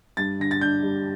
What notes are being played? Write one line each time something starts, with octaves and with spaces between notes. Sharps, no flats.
G2 A6
D3 A#6
A6
D4 G6
G3